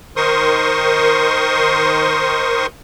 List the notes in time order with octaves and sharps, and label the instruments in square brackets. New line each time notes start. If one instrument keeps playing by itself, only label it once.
[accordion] D#3 A#4 C5 C6 C#6 D#6